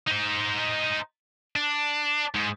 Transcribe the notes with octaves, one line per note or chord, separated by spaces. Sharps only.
D#4 C5
D4
G#2